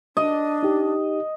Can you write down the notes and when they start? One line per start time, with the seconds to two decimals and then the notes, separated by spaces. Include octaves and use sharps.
0.17 D4 D#5
0.63 D#4 G4